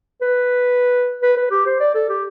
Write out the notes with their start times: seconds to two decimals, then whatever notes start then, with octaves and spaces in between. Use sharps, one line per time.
0.21 B4
1.22 B4
1.37 B4
1.51 G4
1.66 C5
1.80 D5
1.94 A4
2.09 G4